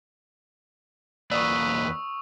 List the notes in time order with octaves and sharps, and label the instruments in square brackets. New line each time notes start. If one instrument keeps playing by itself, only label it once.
[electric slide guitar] E2 A#3 D5 [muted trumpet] B4 [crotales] C#6 D#6 E6